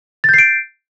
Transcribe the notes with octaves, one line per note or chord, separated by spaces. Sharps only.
G6 A6 C7 D7